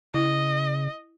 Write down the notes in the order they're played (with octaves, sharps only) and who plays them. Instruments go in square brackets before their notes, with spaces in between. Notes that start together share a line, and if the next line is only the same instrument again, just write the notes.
[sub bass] C#3 [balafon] E4 [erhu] D#5